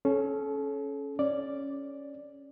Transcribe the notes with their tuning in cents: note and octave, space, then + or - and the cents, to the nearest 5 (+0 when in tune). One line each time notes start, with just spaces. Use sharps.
C#4 -5 A4 -35
C#4 +0 D5 +0